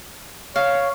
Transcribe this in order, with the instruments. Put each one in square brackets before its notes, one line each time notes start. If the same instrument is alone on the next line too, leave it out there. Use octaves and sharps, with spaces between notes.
[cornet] C#5 [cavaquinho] F5